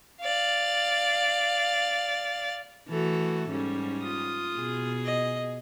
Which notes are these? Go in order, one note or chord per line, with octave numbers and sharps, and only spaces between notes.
D5 F5
E3 A3 F#4 A4
G#2 G3 C#4
F4 D#6
B2 G#4
D#5